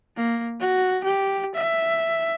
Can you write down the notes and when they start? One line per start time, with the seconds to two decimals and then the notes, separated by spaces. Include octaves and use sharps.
0.17 A#3
0.60 F#4
1.04 G4
1.55 E5